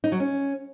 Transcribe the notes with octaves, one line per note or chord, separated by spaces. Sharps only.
D#4
F#3
C#4